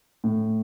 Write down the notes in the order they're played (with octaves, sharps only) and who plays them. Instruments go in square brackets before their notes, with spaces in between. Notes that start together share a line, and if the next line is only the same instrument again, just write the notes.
[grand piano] A2